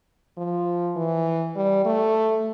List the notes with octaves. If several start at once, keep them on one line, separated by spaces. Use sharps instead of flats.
F3
E3
G3
A3